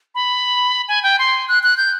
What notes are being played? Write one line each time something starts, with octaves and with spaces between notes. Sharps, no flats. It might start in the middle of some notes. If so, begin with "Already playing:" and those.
B5
G#5
G5
C6
F#6
F#6
G6